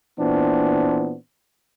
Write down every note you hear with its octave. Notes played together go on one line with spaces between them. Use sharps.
A#2 E3 B3 C4 D4